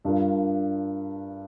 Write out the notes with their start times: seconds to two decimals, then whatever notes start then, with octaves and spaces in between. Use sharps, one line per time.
0.05 G2 G3 D4 F4 A#4